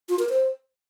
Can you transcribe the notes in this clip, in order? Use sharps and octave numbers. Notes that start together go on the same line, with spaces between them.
F4
A#4
C5